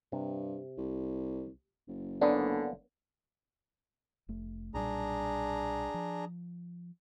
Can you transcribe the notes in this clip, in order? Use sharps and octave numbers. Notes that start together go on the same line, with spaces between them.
G2 C3
C2
F#1
D3 A#3 B3 C#4 D4
F1 A3
B1 A#2 G3 D4 G#4 A#5
F3